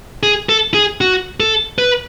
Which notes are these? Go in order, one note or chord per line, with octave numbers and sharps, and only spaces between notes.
G#4
A4
G#4
F#4
A4
B4